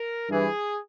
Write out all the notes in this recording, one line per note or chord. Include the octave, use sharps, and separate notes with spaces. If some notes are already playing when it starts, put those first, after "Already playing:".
Already playing: A#4
G2 E3 G#4